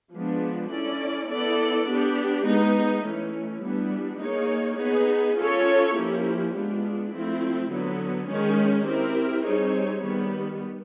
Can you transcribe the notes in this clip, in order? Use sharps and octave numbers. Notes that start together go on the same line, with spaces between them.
F3 G#3 B3 D4
C#4 E4 A4 D5
B3 E4 A4 D5
B3 D4 G4
G#3 B3 D#4
E3 A3 C#4
E3 G3 B3 D4
A#3 D#4 G#4 C#5
B3 D#4 G#4
C#4 F4 A4 C#5
F3 A#3 C#4 E4 G4
G#3 B3 D4 F4
F3 A3 C4 E4
D3 F#3 B3
D#3 G#3 C#4
C4 E4 G4 A#4
G3 C4 D#4 G#4 C#5
D#3 G3 B3